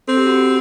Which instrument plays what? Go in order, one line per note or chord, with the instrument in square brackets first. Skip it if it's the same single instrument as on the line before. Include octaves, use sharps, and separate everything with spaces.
[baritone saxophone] C4 [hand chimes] A4
[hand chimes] G4
F#4
G4